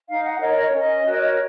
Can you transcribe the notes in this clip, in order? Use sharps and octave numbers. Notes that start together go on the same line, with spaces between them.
D#4 F5
F#5
A#4 C#5 D#5
C#5
C#4 D#5
F#4 A#4 C#5